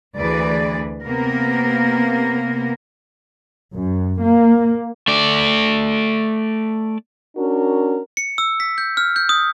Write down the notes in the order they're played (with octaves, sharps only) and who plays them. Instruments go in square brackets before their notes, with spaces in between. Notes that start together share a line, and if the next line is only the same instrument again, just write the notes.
[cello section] D2 E3 G#4 B4 D5
C3 A#3 B3 A#4
[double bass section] F#2
A#3
[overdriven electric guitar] A3 D5
[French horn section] C#4 D4 F#4 A#4
[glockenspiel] C#7
E6
B6
G6
F6
G6
D#6